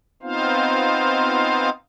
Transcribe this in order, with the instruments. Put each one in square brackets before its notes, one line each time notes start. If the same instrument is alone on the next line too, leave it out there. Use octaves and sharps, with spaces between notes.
[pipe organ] B3 C4 D#4 F4 C5 F5